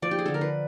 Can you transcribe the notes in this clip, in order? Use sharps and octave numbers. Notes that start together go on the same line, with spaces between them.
F3 D5
G4
G#4
D3 A4
A#4
B4